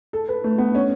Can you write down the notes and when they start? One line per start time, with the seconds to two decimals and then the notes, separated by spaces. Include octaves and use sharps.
0.13 A4
0.28 B4
0.44 A3
0.58 B3
0.75 C#4